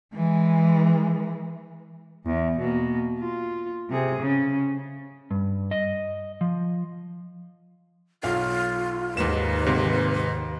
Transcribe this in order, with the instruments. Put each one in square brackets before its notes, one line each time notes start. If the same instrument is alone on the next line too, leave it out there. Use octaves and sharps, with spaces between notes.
[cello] E3 G#3
E2
B2 A#3
F4
C3 G#4
C#3
[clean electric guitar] G2
D#5
F3
[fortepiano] B1 F5 [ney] F4
[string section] D#2 [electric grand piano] G#2 E7 [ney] B4
[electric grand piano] G#2 [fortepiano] C3